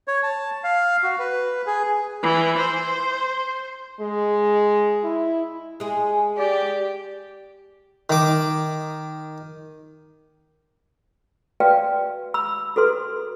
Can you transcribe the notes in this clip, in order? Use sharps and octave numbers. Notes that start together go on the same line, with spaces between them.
C#5
A5
F5
F#4
B4
G#4
E3
C5
G#3
E4
G#3 G#4
G4 D5
D#3 D6
F#4 B4 D5 F5 G5
B5 E6
F#4 A4 B4 C6